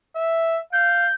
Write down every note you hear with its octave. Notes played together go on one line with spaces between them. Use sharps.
E5
F5 G6